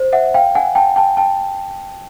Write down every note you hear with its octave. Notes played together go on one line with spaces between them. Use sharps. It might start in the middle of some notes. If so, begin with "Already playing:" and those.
Already playing: C5
E5 F#5
F5 G5
F#5 G#5
G5 A5
G5 A5
G5 A5